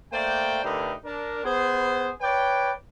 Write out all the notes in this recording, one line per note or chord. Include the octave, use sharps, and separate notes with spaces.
A3 A#3 C5 D5 G5
D3 A3 D#4 G4 A#4 B4
D4 A#4
B3 G#4 C5
B4 C#5 D5 G5